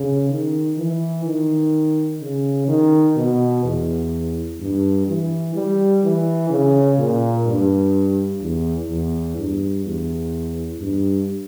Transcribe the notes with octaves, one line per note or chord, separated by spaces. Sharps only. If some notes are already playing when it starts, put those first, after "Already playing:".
Already playing: C#3
D#3
E3
D#3
C#3
D#3
B2
E2
G2
E3
G3
E3
C#3
A#2
G2
E2
E2
G2
E2
G2